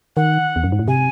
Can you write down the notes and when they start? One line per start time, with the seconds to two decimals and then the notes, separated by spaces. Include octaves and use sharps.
0.16 D#3 F#5
0.56 E2
0.64 F#2
0.72 G#2
0.79 A2
0.88 C3 G#5